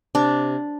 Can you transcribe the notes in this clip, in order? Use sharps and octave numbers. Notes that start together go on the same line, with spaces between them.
C3 D4